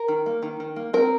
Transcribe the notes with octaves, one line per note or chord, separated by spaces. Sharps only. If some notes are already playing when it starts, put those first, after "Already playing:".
Already playing: A#4
D#3
A#3
D#3
D#3
A#3
C4 A#4